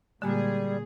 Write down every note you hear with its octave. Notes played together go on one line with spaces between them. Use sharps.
A#2 D3 G3 G#3 A#3 G#4